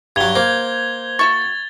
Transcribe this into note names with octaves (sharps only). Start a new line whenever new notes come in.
G2 F#3 G#6 F7 G7
A#3 C5
F#4 E5 C#6 A6